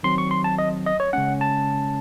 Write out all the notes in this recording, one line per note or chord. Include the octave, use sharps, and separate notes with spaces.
D#3 F#3 C4 C6
C#6
C6
A5
D#5
D#5
C#5
C#3 G#3 C#4 F#5
A5